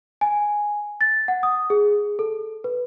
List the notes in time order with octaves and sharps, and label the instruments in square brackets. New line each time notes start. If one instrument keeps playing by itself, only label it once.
[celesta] G#5
A6
F#5
D#6
G#4
A4
B4